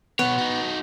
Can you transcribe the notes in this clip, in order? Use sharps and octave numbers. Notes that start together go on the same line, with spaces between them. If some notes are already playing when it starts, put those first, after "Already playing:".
B2 B3 C#5
D#4 F#4